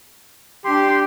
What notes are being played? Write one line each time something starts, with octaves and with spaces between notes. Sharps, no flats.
D4 G4 C6